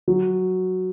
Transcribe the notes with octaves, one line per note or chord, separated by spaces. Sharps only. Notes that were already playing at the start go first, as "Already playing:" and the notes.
F#3